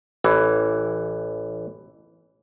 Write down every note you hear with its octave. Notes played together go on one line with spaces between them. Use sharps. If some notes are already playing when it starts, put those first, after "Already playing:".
A1 E3